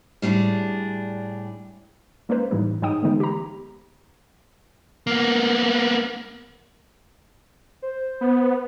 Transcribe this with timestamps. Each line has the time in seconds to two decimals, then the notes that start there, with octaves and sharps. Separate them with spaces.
0.22 A2 G3 D4 G#4
2.29 G#3 A#3 C#4 B4 C5
2.51 A2 E3 G3 D#4
2.82 G#2 F#3 D#4 G5 D#6
3.03 D3 E3 G#3 A3 B3 D#4
3.20 G4 A#5
5.07 A#3 B3
7.82 C5
8.21 B3